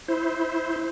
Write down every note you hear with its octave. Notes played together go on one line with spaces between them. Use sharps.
E4 C5